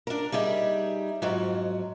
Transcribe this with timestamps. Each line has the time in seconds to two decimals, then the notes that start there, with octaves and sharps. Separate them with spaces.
0.07 D4 A#4
0.32 G3 D#4 G#4 E5
1.22 F2 G#2 F#3